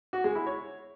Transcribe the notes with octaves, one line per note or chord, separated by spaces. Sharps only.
F#4
G#3
E4
C#5